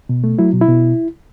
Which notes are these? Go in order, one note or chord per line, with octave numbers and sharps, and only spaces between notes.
B2
A3
F#3 E4
B2
E4
B2